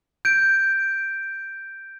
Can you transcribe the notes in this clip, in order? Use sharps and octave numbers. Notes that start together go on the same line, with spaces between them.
G6 D7